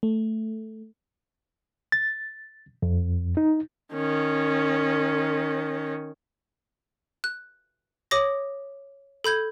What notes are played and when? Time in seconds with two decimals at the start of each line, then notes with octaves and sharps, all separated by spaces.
0.03 A3
1.92 A6
2.82 F2
3.37 D#4
3.94 D#3 C#4
7.24 F#6
8.11 C#5 D6 D#6 A#6
9.24 A4 B5 G6 G#6